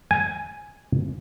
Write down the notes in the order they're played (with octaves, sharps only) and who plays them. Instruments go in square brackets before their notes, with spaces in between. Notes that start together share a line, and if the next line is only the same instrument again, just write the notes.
[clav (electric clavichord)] G#5